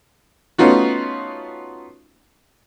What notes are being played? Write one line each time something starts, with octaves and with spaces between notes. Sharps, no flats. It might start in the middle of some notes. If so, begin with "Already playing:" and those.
A3 B3 C#4 D#4 F4 F#4